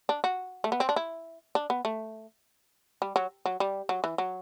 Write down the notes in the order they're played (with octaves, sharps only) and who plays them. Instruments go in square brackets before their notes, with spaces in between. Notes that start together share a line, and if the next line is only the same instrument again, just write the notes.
[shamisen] D4
F#4
A3
B3
C4
D4
E4
D4
B3
A3
G3
F#3
F#3
G3
F#3
E3
F#3